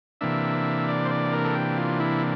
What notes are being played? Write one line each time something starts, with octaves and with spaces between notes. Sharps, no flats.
C3 E3 A#3 D4 E5
D5
C5
D5
A#4
A4
G4
F4
E4